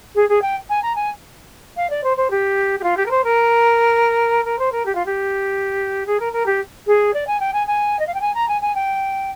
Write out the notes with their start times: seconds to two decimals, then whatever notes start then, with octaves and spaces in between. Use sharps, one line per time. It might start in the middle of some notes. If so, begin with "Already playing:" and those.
0.15 G#4
0.29 G#4
0.41 G5
0.69 G#5
0.82 A#5
0.95 G#5
1.76 F5
1.89 D5
2.03 C5
2.17 C5
2.30 G4
2.79 G4
2.83 F4
2.96 G4
3.05 A#4
3.10 C5
3.24 A#4
4.45 A#4
4.58 C5
4.72 A#4
4.85 G4
4.95 F4
5.05 G4
6.06 G#4
6.19 A#4
6.32 A#4
6.46 G4
6.86 G#4
7.13 D5
7.27 G#5
7.39 G5
7.53 G#5
7.67 G#5
7.99 D#5
8.06 F5
8.14 G5
8.21 G#5
8.34 A#5
8.48 G#5
8.61 G#5
8.74 G5